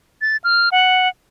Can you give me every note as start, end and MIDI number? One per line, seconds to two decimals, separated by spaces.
0.21 0.37 93
0.44 0.69 89
0.72 1.09 78